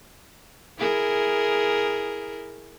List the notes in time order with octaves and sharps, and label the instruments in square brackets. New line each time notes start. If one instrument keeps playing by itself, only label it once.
[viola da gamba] E4 G#4 A#4